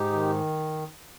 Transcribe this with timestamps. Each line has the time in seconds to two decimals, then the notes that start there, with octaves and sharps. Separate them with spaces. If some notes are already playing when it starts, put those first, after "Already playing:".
Already playing: G#2 D#4 G4
0.12 D#3